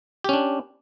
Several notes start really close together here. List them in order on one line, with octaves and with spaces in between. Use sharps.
G4 C#4 D4